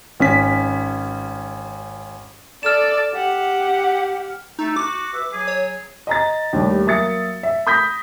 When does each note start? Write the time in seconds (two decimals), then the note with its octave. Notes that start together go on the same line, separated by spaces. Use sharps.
0.20 G#1 C#4 B6
2.63 A4 D5 F6 E7
3.14 G4 F#5
4.59 A3 D#4
4.76 F#4 D6
5.14 B4 E5
5.32 F#3 G#4
5.47 C#5
6.07 D#5 A#5 A6
6.53 D#2 D3 G3 A3
6.86 F#3 A#3 E5 D#6 A6 C#7
7.43 E5
7.67 B5 D#6 G6 A#6 B6